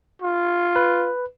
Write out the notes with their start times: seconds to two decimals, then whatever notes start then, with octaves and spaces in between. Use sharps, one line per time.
0.22 F4
0.76 B4